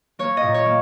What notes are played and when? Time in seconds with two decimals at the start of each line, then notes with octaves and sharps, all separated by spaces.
0.19 A#3 C#5
0.37 D#5
0.43 A#2
0.54 C#5
0.66 A#3